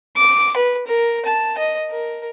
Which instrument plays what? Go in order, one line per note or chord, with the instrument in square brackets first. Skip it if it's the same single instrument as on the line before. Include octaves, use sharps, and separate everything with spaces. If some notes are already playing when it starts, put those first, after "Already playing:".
[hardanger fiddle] D6
B4
A#4
A5
D#5
A#4